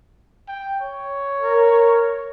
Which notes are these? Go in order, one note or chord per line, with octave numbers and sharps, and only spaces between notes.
G5
C#5
A#4